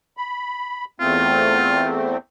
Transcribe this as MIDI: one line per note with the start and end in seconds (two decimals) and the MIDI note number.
0.17 0.85 83
1.00 2.17 40
1.00 2.17 57
1.00 2.17 60
1.00 1.90 65